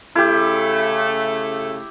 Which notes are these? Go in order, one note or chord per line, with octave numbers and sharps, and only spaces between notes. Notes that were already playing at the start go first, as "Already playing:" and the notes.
C#3 A3 E4 G4